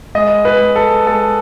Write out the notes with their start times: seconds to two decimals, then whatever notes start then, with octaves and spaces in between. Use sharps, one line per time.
0.15 G#3 D#5
0.45 B4
0.60 G#3
0.76 A4
1.07 G#3 A4